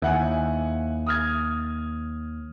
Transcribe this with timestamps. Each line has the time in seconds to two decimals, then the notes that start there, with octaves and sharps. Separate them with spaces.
0.02 D#2 E4 F#5 G#5
1.06 D#6 F6 G#6